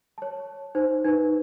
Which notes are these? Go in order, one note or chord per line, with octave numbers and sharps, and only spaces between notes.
C#5 A5
D#4 C5
D#4 B4